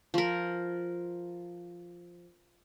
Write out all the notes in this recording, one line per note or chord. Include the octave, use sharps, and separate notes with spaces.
F3 A#4